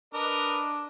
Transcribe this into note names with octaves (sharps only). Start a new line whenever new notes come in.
D4 A#4 B4 D#5